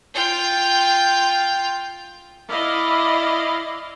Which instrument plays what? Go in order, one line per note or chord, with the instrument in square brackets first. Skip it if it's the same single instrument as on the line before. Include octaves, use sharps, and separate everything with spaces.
[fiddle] F4 G5
[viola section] E4 D5 D#5 F5